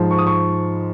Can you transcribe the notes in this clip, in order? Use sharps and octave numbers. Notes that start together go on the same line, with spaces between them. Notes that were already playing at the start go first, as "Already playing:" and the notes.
Already playing: G#2 F3 G#3
C#6
D#6
C#6